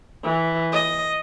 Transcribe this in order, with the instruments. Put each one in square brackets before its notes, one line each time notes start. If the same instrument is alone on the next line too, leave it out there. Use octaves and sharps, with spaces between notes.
[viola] E3
D#5